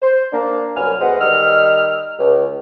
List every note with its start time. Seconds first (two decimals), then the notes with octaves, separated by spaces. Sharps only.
0.02 C5
0.32 A#3 D4
0.76 C2 F#2 F#3 B4 G#5 F6
1.00 D2 G#3 B3 C5 D#5 F#5
1.21 D#3 G3 D#5 E6 F6
2.19 C#2